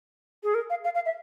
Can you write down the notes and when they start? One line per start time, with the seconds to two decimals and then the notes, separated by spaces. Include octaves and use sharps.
0.43 G#4
0.54 A#4
0.70 F5
0.84 F5
0.95 F5
1.06 E5